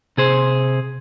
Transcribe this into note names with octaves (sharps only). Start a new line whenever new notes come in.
C3 G#4 C5